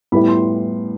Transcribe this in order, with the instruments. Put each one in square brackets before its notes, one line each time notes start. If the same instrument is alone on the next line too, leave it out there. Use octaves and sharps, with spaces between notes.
[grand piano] A2 G3 B3 E4 B5
C6